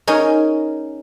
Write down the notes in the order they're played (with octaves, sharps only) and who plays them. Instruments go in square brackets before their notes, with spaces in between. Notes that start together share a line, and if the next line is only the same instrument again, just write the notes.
[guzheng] C#4 D#4 G#4 A#4